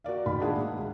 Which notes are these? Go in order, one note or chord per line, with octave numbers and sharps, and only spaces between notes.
F#4 A#4 D5 F5
A1 D#3 F#4 F5 B5
A#3 D4 F4 G#4 E5 F#5
G#2
C#2